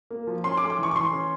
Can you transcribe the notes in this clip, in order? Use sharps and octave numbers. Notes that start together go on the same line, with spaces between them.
A#3
F3
C#4 C6
D6
A3
D6
E3 C#6
C#6
E3 C6
C#4